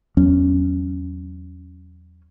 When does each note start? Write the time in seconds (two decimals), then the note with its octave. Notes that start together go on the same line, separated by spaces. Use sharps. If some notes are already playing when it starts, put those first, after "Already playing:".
0.17 E2 F#3 C#4